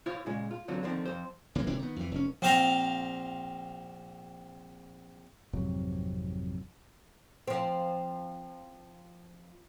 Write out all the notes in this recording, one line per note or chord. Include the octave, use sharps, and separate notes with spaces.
E4 F4 C5 C#5
A#2 C#3 G#3
F4
E2 D3 F#3 C4 F4
D3 D#3 F3 C4
F2 C5
F#1 E3 A#3
E1 C3 E3 D4
D#3 B3
F2 E3
F1 C#4
A#1 C4 C5 F5 A#5 C6
G#1 F2 C3 F#3
F3 C4